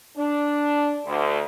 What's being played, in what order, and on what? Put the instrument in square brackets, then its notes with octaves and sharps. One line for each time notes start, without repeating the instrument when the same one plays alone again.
[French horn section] D4
D2